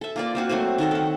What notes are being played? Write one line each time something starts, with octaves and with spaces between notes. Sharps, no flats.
A4 E5
A#3 F4 D5
A#3 C4 F#4
F#3 A3 C4 F#4
D#3 F#4 A4 A#4
A4 F#5